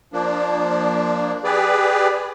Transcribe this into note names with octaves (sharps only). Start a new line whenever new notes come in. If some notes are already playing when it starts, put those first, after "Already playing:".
F3 A#3 D4
G4 G#4 B4 D5